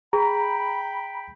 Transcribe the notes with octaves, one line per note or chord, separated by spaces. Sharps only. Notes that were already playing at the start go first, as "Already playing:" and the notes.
G#4 G5 A#5 B5